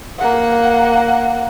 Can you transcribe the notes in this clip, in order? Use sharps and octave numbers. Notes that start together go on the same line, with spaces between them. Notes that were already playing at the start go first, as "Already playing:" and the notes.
A#3 F#5